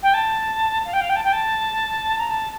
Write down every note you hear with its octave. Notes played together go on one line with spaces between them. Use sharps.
G5
A5
F5
G5
F5
G5
A5
G5
A5
A#5
A5